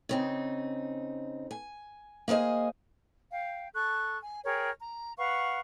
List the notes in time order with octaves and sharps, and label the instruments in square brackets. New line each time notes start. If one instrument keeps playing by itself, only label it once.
[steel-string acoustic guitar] C#3 C4 D#4
G#5
A#3 G#4 C5 D#5 G#5
[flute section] F5 G5
A4 A5 C#6 F#6
G#5
G#4 A#4 C#5 G5
A#5
B4 F5 F#5 C#6